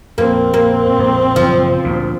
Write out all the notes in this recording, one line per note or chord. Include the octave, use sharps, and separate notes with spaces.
A#1 F2 A#3 C4
A#3
F2
F#1 F3
D2 A#2